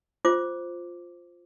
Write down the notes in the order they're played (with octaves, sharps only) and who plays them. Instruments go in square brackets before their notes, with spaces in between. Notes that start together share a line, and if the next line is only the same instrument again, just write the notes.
[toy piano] F4 C5 D6